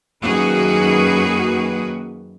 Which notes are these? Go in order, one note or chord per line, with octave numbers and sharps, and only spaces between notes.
F#2 D#3 A#3 F#4 G#4 B4